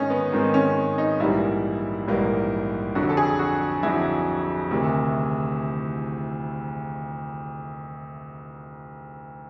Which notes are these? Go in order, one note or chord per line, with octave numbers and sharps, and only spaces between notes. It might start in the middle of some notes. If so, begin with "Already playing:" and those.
Already playing: G#2 D#3 G#3 C#4 D#4
B3
G#2 D#3 G#3 C4
C#4
D#4
A#1 G#2 E3 G3 A#3 E4
A#1 G#2 E3 G3 A#3
F2 D3 F#3 F#4
A4
G#4
F#4
F2 D3 F#3 E4
D2 C3 D#3